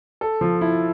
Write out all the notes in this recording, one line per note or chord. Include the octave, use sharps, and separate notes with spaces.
A4
F3
E4